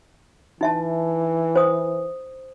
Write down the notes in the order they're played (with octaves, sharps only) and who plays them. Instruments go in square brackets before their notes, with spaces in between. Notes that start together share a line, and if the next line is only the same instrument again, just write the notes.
[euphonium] E3 [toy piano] D#4 E5 A5
[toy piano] C5 D#6